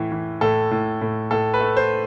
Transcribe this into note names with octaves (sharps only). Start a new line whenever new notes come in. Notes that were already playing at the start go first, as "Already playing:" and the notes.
Already playing: A2 E3
E3
A2 A4
A2
A2
A2 A4
B4
A3
C5